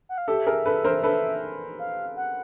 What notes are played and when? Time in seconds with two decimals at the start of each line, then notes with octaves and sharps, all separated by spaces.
0.09 F#5
0.18 F5
0.28 G4 A4 E5
0.47 G#4 A#4
0.65 A4 B4
0.84 A#4 C5
1.03 A4 B4
1.79 F5
2.17 F#5